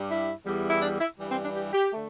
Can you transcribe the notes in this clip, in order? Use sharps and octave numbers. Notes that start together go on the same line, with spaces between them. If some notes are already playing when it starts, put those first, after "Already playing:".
Already playing: G2 G3
E4
E2 E3 G3
E4
D4
E4
G2 E3 G3
C4
D4
G4
G4
D3 A3